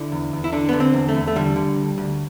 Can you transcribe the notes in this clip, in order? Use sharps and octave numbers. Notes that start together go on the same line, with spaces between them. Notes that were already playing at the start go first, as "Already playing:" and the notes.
Already playing: D3 E4
E2
E2
E4
D3 D4
D3 B3
C4
E2
A3
E2
A3
D3 G3
D3
D2
D2